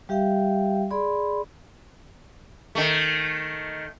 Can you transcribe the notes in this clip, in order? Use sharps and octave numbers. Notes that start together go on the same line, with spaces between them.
G3 G4 E5 F5 G5
G#4 D5 B5 C6
D#3 A3